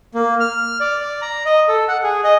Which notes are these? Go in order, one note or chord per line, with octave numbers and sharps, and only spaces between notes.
A#3
F6
D5
A#5
D#5
A4
F#5
G#4
D#5